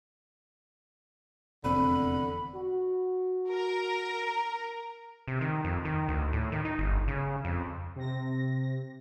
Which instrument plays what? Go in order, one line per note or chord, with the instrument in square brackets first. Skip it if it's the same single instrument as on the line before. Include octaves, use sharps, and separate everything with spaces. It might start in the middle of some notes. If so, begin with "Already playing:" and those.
[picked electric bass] F1 E2 C4 [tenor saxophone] D3 [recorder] B5
[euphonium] F#4
[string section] A#4
[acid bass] C3
D#3
F2
D#3
D2
A2
D#3
D#4
G1
C#3
F2
[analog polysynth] C3 A#6